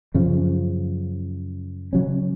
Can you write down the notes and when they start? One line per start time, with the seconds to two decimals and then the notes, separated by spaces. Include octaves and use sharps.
0.14 F#2 C#3 F3
1.93 C#3 F#3 C#4